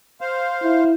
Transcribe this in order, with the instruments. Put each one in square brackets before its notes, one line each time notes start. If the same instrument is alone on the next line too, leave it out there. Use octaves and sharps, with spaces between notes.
[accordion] C5 F5
[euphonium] E4